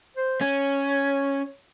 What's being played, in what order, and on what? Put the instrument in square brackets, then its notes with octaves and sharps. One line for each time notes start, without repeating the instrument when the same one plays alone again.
[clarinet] C5
[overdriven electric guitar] C#4 [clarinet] C#5